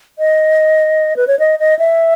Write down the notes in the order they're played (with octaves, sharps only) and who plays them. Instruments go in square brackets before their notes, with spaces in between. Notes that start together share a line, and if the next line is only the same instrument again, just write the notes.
[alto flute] D#5
B4
C#5
D#5
D#5
E5